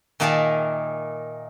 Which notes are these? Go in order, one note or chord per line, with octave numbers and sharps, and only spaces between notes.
A#2 D#3 A#3 G#4 E5 A5